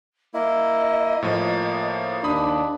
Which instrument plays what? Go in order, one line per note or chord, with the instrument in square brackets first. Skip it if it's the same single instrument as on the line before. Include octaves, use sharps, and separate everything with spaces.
[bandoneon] A#3 E4 [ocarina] D#5
[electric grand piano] A2 F3 [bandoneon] A#3
[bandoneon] D#2 [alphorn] D4 [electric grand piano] B5 D#6